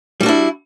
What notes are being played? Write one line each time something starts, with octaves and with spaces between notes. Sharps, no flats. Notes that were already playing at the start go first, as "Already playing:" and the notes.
G3 D4 E4 F#4